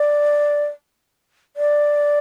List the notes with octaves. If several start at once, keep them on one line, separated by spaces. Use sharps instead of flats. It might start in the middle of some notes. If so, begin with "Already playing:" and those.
Already playing: D5
D5